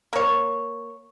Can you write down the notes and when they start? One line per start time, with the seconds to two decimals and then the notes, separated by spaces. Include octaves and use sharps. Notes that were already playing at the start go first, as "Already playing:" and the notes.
0.13 A#3 C#5